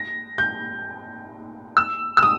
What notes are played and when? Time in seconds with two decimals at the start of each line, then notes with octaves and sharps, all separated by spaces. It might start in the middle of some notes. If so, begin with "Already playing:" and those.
Already playing: A#6
0.38 G6
1.77 E6
2.17 E6
2.23 D#6